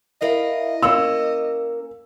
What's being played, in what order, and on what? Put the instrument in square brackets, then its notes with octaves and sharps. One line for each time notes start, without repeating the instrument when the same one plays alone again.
[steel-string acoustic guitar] E4 A#4 F5 [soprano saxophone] D#5
[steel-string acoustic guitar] A#3 C#4 A#4 [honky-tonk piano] E6